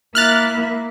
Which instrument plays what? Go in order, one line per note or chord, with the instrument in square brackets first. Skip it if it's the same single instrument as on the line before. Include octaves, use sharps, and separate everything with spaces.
[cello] A#3 E4 [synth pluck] F6 F#6 A6